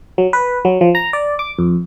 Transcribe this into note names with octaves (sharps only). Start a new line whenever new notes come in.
F#3
B4
F#3
F3
A#5
D5
D6
F2